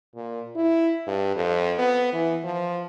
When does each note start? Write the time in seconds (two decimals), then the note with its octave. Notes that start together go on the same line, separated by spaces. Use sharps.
0.15 A#2
0.55 E4
1.07 G2
1.36 F2
1.78 B3
2.13 E3
2.44 F3